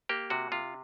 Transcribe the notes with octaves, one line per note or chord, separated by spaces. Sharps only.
A#3 G4
C3 F#4
C3 F4